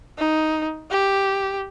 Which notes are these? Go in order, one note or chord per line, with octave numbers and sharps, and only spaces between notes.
D#4
G4